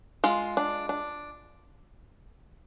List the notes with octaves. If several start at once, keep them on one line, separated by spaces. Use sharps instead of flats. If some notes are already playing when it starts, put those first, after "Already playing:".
G#3 F4
D4
D4